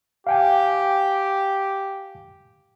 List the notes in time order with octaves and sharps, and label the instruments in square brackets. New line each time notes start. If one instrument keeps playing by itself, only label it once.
[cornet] G4 [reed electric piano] F5 G5 G#5